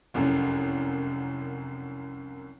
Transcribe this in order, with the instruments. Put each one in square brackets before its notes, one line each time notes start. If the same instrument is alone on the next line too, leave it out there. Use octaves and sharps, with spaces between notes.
[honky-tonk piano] F1 C2 F#2